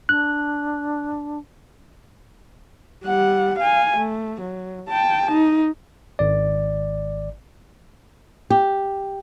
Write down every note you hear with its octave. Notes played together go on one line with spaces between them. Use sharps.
D4 F#6
G3 F#5
F5 G#5
A3
F#3
G5 A5
D#4
G#1 D5
G4